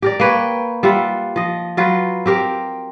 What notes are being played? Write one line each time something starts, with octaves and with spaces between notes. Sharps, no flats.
G4 A#4 D5
A#3 B4 C#5 G5
G3 F4 E5 F#5
F3 D#5
F#3 F4 B4
C4 G4 A#4